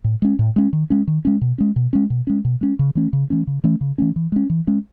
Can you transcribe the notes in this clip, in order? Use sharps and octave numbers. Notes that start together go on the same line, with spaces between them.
A2
G#3 C#4
A2
G#3 C#4
D#3
G#3 C#4
D#3
G#3 C#4
B2
G#3 C#4
B2
G#3 C#4
B2
G#3 C#4
B2
G#3 C#4
C#3
E3 A3 C#4
C#3
E3 A3 C#4
C#3
E3 A3 C#4
C#3
E3 A3 C#4
E3
G#3 C#4
E3
G#3 C#4